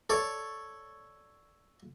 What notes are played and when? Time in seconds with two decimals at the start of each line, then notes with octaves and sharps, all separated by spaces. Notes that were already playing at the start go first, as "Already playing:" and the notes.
0.10 A4 C#5 D5